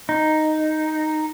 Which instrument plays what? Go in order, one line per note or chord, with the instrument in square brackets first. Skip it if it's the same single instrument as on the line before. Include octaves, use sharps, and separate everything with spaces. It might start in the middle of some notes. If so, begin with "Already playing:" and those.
[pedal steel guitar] D#4